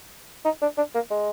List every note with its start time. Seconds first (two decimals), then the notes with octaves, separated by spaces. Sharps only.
0.45 D#4
0.62 D4
0.77 D4
0.95 A#3
1.11 G#3